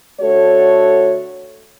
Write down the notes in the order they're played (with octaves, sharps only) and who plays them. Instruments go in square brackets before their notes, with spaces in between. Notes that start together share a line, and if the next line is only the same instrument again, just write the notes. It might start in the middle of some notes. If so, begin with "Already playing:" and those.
[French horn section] D3 A3 F#4 A4 C#5